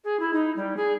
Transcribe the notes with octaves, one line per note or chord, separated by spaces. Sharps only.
G#4
E4
D#4
G3
G#4